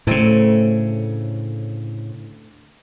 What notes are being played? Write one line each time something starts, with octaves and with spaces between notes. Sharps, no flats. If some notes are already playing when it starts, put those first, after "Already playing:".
D2 A2 C#3 A3 C4